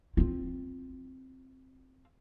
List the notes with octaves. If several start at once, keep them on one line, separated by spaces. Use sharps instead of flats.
C4 F4